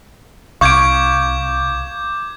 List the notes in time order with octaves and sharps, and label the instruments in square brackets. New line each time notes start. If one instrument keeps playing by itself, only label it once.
[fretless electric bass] C2 [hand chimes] F5 D7 [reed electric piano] C#6 [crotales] D6 G6 G#6